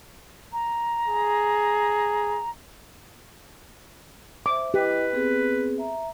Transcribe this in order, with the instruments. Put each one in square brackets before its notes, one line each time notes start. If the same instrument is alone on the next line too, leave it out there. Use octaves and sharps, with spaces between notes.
[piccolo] A#5
[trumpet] G#4
[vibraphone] C5 E5 [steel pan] D6
[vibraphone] E4 D#5 [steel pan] G4 [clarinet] B4
[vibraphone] B3 C4 G#4
E5 A#5